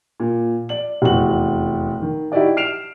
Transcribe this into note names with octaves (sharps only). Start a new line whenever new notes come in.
A#2
D5 F#7
F1 E2 F#4 F#7
D#3
D#4 E4 F#4 G4 D5 D#5
F6 C7 D7 E7 F7